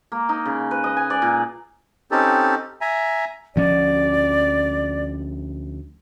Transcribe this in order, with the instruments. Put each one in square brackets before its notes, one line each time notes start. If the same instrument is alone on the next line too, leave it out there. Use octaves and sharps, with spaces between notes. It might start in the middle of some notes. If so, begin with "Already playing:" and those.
[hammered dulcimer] A#3
D#4
C#3
B4
D#5
G#5
D5
A#2
[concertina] C4 C#4 D#4 G4 A4
E5 G#5 A#5
[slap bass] D2 F3 C#4 [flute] D5